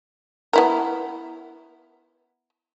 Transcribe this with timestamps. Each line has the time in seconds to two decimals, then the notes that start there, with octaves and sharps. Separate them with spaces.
0.53 B3 E4 A#4